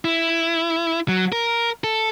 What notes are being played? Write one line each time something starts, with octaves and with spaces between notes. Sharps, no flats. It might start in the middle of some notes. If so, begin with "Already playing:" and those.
E4
F#3
A#4
A4